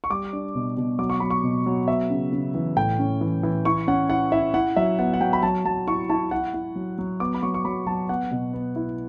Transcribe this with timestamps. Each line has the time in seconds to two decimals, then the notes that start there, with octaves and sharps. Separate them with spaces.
0.04 C#6
0.10 G3 D6
0.33 D4
0.55 B2
0.77 B2
0.99 F#3 D6
1.10 C#6
1.20 F#3 B5
1.30 C#6
1.43 B2
1.66 F#3
1.88 B3 E5
2.10 C#3
2.33 C#3
2.55 E3
2.76 A2 G5
2.99 C#4
3.21 E3
3.43 E3
3.65 E4 C#6
3.87 C#4 F#5
4.10 E4 F#5
4.32 E4 E5
4.54 E4 F#5
4.76 F#3 E5
4.98 B3 F#5
5.14 F#5
5.21 F#3 G5
5.33 B5
5.43 F#3 A5
5.65 F#3 A5
5.87 E4 C#6
6.10 E4 A5
6.31 E4 F#5
6.54 E4
6.76 F#3
6.98 F#3
7.20 B3 D6
7.34 B5
7.43 F#3 C#6
7.54 C#6
7.65 F#3 B5
7.87 F#3 A5
8.09 B3 F#5
8.31 B2
8.53 B3
8.76 E4